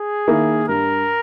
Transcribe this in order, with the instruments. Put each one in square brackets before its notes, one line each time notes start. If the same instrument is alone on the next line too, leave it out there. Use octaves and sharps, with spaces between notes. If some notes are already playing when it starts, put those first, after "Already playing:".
Already playing: [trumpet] G#4
[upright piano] D#3 A#3 E4
[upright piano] G2 [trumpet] A#4